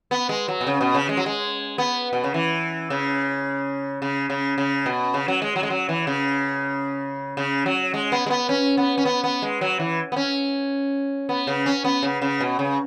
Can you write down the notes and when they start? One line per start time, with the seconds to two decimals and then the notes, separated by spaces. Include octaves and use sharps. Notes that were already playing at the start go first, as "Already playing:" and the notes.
0.11 B3
0.29 G#3
0.48 F#3
0.61 B2
0.67 C#3
0.81 B2
0.95 C#3
1.09 G#3
1.17 F#3
1.26 G#3
1.78 B3
2.13 B2
2.24 C#3
2.34 E3
2.90 C#3
4.02 C#3
4.30 C#3
4.58 C#3
4.86 B2
5.14 C#3
5.28 F#3
5.42 G#3
5.56 F#3
5.63 G#3
5.70 F#3
5.89 E3
6.07 C#3
7.37 C#3
7.66 F#3
7.94 G#3
8.12 B3
8.26 G#3
8.30 B3
8.49 C#4
8.77 B3
8.98 C#4
9.05 B3
9.24 B3
9.42 G#3
9.61 F#3
9.79 E3
10.12 B3
10.16 C#4
11.29 B3
11.47 C#3
11.66 C#4
11.84 B3
12.03 C#3
12.22 C#3
12.41 B2
12.59 C#3